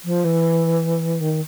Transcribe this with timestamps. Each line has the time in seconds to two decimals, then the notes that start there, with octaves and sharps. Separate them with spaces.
0.05 F3
0.24 E3
1.21 D#3